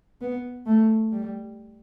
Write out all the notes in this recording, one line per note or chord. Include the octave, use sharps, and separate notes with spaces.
B3
A3
G3